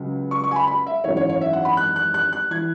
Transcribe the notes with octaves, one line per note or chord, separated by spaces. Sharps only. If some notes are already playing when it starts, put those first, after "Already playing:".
Already playing: C#2 C#3 F#3
C#6
C#6
G#5
B5
B5
E5
G#1 F#2 E3 C#5
C#5
C#5
E5
F#5
B5
F#6
F#6
F#6
F#6
E3 G#6